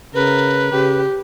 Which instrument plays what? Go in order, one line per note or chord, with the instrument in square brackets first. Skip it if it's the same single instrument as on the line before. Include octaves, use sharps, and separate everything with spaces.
[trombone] C#3 [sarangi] A#4 [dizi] B4
[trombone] C#3 [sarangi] G4